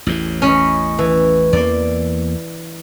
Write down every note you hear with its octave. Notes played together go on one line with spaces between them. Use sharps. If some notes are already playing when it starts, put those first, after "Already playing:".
A1 E2 A2
C#4 D#5 B5
E3
E2 A#3 D5